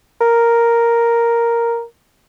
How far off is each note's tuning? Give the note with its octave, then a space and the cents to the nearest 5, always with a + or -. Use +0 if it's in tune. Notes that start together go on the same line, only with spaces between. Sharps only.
A#4 +0